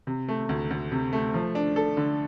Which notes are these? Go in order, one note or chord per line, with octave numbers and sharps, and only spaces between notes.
C3
A3
D2
D2
C3
A3
F3
D4
A4
D3